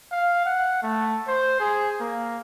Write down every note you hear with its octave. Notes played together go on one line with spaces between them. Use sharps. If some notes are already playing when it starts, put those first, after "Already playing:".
F5
F#5
A3
C5
G#4
A#3